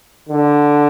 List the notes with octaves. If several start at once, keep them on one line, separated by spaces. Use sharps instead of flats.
D3